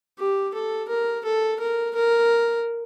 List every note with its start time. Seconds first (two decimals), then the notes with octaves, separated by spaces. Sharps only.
0.19 G4
0.54 A4
0.89 A#4
1.25 A4
1.60 A#4
1.95 A#4